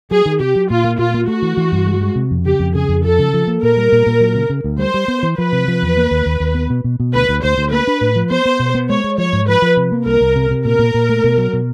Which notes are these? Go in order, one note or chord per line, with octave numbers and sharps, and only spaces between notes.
F#3 G#4
D#3
C3 G4
F#3
A#2 F4
A#3
A#2 F4
A#3
A3 F#4
E3
E3
G2
G#3
G#3
C3
F2
C#3 G4
F2
C#3 G#4
F2
F3 A4
C#3
F3
A#3
A#2 A#4
G3
A#2
A#2
F#3
C#3
C#3
D2
G3 C5
G3
B3
E3
F3 B4
C3
F3
E2
A#3
D#2
D#2
D#2
B3
B2
B2
B2
D2 B4
D2
D2 C5
D2
A#3 B4
D4
A2
F3
B3 C5
B3
B2
B3
G#3 C#5
G#3
F3 C#5
G#2
F3 B4
F3
C3
A#3
C2 A#4
C2
C3
C3
A#2 A#4
A#2
A#2
A3
B2
F#3
B2